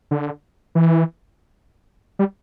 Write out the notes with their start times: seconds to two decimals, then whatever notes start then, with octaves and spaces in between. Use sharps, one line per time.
0.11 D3
0.75 E3
2.19 G3